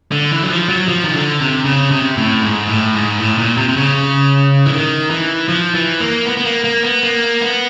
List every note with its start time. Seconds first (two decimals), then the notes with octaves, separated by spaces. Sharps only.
0.12 D3
0.31 E3
0.43 F#3
0.50 F3
0.69 F#3
0.88 F3
1.04 D#3
1.14 D3
1.40 C3
1.65 C#3
1.91 C3
2.17 A2
2.42 G#2
2.67 A2
2.93 G#2
3.19 A2
3.38 A#2
3.57 C3
3.69 C3
3.76 C#3
4.66 E3
4.73 D#3
5.10 E3
5.48 F3
5.75 E3
6.00 A#3
6.26 B3
6.37 B3
6.45 A#3
6.64 A#3
6.83 B3
7.03 A#3
7.41 B3